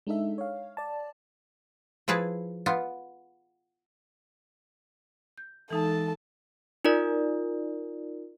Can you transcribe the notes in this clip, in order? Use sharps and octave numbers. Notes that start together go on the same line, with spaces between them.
G#3 D4 D#4 A4 E5
C#5 F5
D5 A5
F3 E4 G#4 B4 A5
B3 F4
G6
E3 G#3 D#4 A4 A5
D#4 F4 A#4 D5